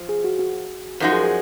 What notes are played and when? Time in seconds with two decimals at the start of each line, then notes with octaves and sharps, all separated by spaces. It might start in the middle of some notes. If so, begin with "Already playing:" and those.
Already playing: F3
0.09 G#4
0.24 F#4
0.39 F#4
1.00 F#2 F3 G#3 D#4 F#4 A#4
1.13 G#4
1.23 G#4